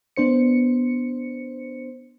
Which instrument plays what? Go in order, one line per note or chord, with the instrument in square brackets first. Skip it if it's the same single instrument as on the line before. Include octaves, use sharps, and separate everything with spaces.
[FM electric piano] B3 D4 C5 C#7